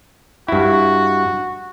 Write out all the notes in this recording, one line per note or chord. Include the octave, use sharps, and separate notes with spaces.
G2 E4 F#4